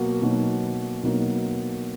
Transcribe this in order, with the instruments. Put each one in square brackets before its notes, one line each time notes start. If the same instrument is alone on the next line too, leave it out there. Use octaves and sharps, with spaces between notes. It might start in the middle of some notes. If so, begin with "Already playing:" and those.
Already playing: [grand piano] B2 F#3 A#3 F#4
B2 F#3 A#3 D#4 F#4
B2 F#3 A#3 D#4 F#4